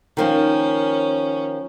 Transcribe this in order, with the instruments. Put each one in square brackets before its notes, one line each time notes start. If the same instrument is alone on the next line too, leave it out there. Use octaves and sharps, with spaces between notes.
[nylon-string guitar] D#3 F3 A#3 [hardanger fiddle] C#4